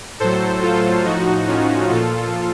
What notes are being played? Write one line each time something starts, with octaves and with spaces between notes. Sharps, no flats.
A2 F#3 A4 C5
F4 A4
A2 F3 D#4 F#4
C#4 F4
A#2 F3 F4 A4